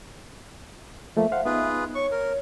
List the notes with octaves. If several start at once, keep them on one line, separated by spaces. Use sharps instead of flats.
F3 A3 A#3 E5
C5 F5 F#5
B3 D#4 F4 G#4 B4
C#5 C#6
A#4